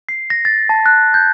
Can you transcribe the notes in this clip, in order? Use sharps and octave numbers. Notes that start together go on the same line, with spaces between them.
C7
A#6
A6
A5
F#6
G6